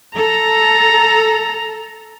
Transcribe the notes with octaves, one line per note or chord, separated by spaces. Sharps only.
A4 A#5